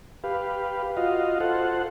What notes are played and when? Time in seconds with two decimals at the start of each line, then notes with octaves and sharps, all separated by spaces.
0.24 G4 B4 F5
0.97 F4 F#4 D#5 F5
1.40 F4 A4 C5 F#5